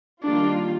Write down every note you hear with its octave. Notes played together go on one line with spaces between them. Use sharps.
D#3 G3 A#3 D4 F4